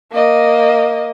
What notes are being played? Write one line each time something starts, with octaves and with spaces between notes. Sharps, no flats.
A#3 D#5